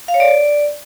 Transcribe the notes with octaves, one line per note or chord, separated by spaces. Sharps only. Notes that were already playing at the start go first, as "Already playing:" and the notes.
F5
C#5
D5